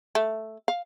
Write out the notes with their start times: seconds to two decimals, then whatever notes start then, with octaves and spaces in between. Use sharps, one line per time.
0.15 A3
0.68 F5